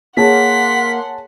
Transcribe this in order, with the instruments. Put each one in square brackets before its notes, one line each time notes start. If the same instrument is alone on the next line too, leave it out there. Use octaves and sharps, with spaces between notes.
[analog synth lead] A#3 [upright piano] G#4 C#5 A5 [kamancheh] F#5 C6 [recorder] B6